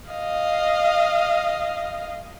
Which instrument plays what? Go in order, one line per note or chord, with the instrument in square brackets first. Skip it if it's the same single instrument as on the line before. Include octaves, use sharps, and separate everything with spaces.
[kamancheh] D#5 F5